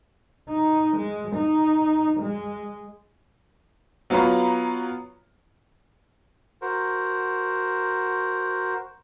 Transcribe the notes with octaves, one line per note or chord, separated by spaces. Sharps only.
D#4
G#3
D#4
G#3
F#3 B3 F4 C#5 A#5 B5
F#4 A#4 C5